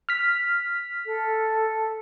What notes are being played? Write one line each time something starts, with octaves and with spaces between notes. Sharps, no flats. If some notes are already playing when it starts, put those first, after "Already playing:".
F6 B6
A4